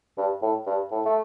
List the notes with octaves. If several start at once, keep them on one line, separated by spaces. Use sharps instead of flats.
G2
A2
G2
A2
A3